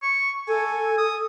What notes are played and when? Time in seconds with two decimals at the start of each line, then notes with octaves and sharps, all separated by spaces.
0.02 C#6
0.48 A4 G#5
0.98 D#6